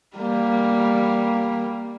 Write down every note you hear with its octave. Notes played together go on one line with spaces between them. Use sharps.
G3 A#3